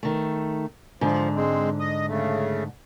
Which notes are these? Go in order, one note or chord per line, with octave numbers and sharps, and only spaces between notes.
D#3 A3
G#2 D3 F3
G#3 C4
D#5
C#3 A3